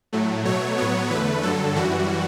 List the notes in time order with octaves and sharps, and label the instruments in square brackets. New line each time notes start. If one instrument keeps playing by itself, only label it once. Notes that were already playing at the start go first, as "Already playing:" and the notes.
[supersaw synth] A2 F#3 A3
B2 F#3 A3 C#5
A2 F#3 B3 C#5
E2 D3 A3 B4
G2 D3 F#3 A4
F#2 E3 G3 F#4